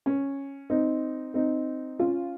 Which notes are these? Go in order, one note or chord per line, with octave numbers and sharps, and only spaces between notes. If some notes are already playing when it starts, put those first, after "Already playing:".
C#4
C4 D#4
C4 D#4
C#4 F4